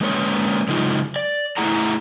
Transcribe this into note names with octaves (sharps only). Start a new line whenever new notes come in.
G#3 A#3 C#4 A#4 B4 C#5
C#3 F#3 G#3 D#4 F4
D5
A3 E4 G#4 F#5 A#5